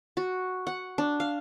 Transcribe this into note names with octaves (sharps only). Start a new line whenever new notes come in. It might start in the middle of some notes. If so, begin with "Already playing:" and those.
F#4
F#5
D4
F5